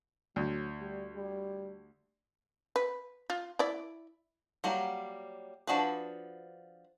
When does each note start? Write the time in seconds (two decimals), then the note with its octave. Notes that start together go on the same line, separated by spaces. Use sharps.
0.36 D2 F#3
0.80 G3
1.15 G3
2.76 B4
3.30 F4
3.59 E4 D5
4.64 F#3 G3 A#3
5.67 F3 D4 F#4 G#4 B4